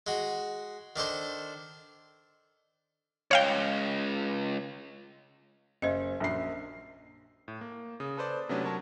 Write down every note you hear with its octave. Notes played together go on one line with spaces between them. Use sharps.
G#3 F#4
D#3 D4 A4 C5
C#2 C#5 F5 G5
F#1 C5 D#5
A#1 F#2 C7
A2
A#3
C#3 D#6
A4 B4 C5 D5
C3 F#3 A3 B3 C#4 D4
F#3 A#4 C#5 A5